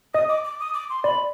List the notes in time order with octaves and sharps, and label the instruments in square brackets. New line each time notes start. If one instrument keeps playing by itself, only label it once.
[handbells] D#5 [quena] D#6
[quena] D6
D6
D#6
D6
C6
[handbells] D5 [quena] B5